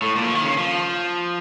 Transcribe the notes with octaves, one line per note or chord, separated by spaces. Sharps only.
A2
A#2
F3
D#3
C#3
F3